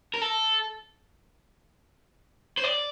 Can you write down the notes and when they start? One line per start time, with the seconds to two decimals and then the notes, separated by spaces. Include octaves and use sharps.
0.14 A#4
0.21 A4
2.58 C5
2.64 D5